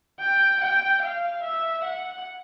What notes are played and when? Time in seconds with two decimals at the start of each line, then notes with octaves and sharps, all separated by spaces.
0.20 G5
0.61 G5
1.02 F5
1.43 E5
1.85 F#5